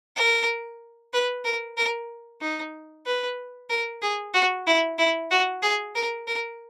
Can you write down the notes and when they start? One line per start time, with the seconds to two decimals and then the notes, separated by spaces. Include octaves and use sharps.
0.16 A#4
1.13 B4
1.45 A#4
1.77 A#4
2.41 D#4
3.06 B4
3.70 A#4
4.02 G#4
4.34 F#4
4.67 E4
4.98 E4
5.31 F#4
5.63 G#4
5.95 A#4
6.27 A#4